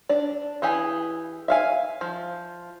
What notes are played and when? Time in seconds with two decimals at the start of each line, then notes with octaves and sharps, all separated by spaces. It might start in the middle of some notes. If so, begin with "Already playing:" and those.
0.09 D4 D5
0.62 E3 G4 G#4 G#5
1.48 E5 F5 G#5
2.01 F3